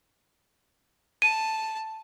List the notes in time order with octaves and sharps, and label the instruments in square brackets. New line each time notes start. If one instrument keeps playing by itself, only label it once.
[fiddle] A5 [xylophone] D#7